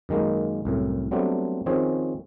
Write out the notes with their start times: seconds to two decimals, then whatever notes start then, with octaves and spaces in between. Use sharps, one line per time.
0.09 F#2 D#3 G#3 A#3
0.65 C2 F#2 A2
1.11 F#3 G3 A3 B3 C4 D4
1.66 D#3 F3 C4 C#4 G#4